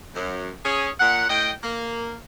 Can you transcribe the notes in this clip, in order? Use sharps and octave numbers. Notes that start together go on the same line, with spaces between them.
F#2
C#4 G#4
A#2 F#5
A2 D#5 G5
A#3